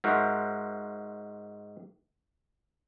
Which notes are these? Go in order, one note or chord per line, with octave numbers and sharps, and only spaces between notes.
G#2 F#4 A#4 C5 E5